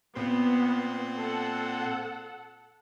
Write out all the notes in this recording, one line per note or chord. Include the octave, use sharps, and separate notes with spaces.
A#2 B3 C4 C6
A4 F#5